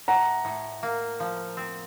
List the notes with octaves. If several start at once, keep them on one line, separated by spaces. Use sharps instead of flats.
A2 F#5 A#5
A2
A#3
F3
C4